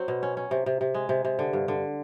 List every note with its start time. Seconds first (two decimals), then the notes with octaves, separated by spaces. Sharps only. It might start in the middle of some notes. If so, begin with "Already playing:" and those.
Already playing: F#3 C4
0.08 B2
0.23 C#4
0.37 C#4
0.51 C3
0.66 C3
0.81 C3
0.94 G#3
1.09 C3
1.25 C3
1.39 D3
1.53 G2
1.68 D3